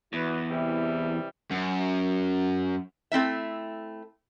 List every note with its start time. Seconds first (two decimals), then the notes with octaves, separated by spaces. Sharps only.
0.13 E2 E4 F#4 B4
0.50 C3 E3 G3
1.51 F#2
3.12 A3 C4 E4 E5